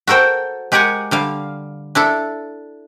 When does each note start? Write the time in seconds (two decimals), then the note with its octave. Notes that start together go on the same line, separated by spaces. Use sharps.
0.07 F#4 A4 A#4 C5 G5
0.72 G#3 G4 A#4 F#5 G#5
1.11 D3 G3 F5
1.95 D4 E4 A4